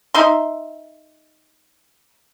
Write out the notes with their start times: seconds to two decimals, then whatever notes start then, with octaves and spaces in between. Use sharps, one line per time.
0.14 D#4 E5 C6